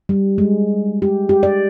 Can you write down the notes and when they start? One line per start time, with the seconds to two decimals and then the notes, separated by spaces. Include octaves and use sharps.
0.09 G3
0.38 G#3
1.02 G4
1.29 G4
1.43 D5